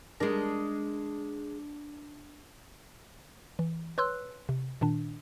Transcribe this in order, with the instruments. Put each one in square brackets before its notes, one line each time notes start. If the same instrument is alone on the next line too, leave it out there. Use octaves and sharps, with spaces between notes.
[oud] G#3 A#4 [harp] D4
[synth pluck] E3
B4 C#5 C6 E6 F#6
C3
A#2 D#3 D4